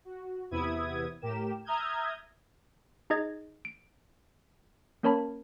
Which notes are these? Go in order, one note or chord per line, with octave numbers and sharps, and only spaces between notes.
F#4
E2 C3 B3 E4 D#6 G#6
A2 G4 A#4 E7
E5 A#5 D#6 F6 G6 G#6
D#4 G#4 D#5 G#6 A6
D7
A#3 C#4 A#4 C#5 A5 B5